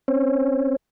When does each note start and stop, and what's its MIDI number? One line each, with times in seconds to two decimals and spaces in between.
0.08 0.76 60
0.08 0.76 61